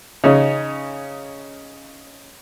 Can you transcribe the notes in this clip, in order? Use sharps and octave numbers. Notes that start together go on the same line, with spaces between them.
C#3 C#4 D#4